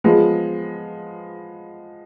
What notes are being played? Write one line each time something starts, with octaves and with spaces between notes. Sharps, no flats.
F3 G#3 B3